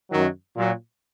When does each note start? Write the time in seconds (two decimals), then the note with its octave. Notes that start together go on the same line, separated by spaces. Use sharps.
0.11 F#2 D#3 F#3
0.55 A#2 F#3